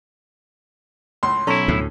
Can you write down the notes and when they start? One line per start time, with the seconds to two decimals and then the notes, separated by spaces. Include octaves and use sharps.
1.23 C#2 A2 C6
1.47 B1 C#4 E4 A4 A#5
1.68 D2 A2